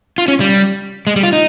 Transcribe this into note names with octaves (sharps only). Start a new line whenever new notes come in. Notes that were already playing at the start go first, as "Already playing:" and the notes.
F4
C#4
G3
G#3
G3
F4
D#4